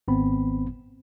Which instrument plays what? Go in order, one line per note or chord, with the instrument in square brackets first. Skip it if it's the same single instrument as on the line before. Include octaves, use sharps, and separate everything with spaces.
[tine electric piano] G#1 B3 C4 B5